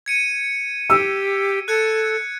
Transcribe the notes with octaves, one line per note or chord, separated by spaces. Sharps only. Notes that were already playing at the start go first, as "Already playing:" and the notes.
G#6 C#7 D#7
G4 E6
A4 F#6 G#6 C#7